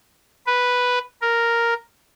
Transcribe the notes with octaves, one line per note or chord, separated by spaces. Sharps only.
B4
A#4